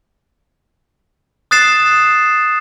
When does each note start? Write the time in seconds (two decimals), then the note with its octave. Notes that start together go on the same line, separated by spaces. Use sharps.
1.51 D#6 F#6 A6 C7 E7